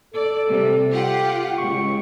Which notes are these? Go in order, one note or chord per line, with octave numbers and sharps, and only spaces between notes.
A4 D5
C3 G3
F4 G4 F#5
C#2 C#6